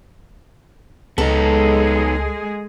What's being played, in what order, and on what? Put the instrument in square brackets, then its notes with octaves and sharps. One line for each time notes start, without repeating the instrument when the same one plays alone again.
[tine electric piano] C#2 [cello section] G#3 G#4 [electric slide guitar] B3 D#4 [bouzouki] A4